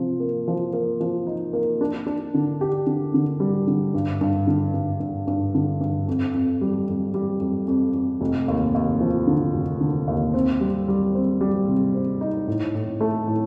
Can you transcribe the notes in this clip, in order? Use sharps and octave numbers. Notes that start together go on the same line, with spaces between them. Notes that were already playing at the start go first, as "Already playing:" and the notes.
Already playing: C3 F3
A#3
F3
A#3
F3
D#4
A#3
D4
D4
D3
G4
D3
D3
G3
D3
G2
G2
D3
G2
G2
G2
D3
G2
F2
F2
G3
F2
G3
F2
F2
F2
F1
D#2
D#2
F3
D3
F1
D3
D#2
C4
G3
G3
C4
G3
C3
C4
D#4
A2
A2
A3
A2